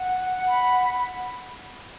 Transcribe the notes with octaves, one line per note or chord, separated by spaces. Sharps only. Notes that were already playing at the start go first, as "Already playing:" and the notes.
Already playing: F#5
B5